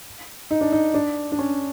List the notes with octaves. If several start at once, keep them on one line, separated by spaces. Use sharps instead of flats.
D#4
D4
D#4
D4
D4
C#4